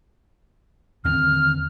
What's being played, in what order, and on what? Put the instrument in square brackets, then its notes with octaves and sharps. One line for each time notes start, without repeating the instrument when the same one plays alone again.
[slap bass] D#2 D3 C4 [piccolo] F6